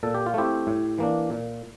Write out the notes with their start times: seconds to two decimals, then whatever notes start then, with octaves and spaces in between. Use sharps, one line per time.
0.03 A#2 A4
0.14 G4
0.26 F4
0.34 A3 C4 E4 G4
0.67 A2
0.98 E3 A#3 D4
1.30 A#2